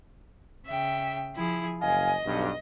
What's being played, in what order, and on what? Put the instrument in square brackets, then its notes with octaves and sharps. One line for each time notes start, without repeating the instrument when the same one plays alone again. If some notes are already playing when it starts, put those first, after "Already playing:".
[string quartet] C#3 E5 G5
F3 E4 G#4
[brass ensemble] F#1 F5 G#5 [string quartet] D#5
[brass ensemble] B1 G2